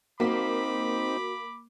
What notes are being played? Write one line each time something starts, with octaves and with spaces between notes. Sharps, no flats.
A#3 C4 D#4 F#4 B5 D6 B6